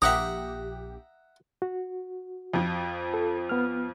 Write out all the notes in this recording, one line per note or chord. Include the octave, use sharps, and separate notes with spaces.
A#1 G4 E5 F#5 A#5 D#6
F#4
F2 F3
A4
B3 F6